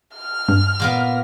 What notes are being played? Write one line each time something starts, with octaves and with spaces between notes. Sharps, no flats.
F6
G2
A#2 A#3 B3